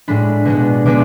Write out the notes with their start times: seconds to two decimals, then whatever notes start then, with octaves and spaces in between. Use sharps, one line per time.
0.08 A2 G#3 D4 B5
0.45 B2 G#3 B3 D4
0.86 B2 G#3 B3 D4 D6